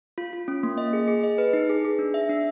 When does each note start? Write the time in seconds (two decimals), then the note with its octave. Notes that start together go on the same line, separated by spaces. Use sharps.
0.18 F4
0.33 F4
0.48 C#4
0.63 A#3
0.78 D#5
0.93 G#4
1.08 G#4
1.23 D#5
1.38 B4
1.53 D#4
1.70 G#4
1.85 G#4
1.99 D4
2.14 E5
2.29 D4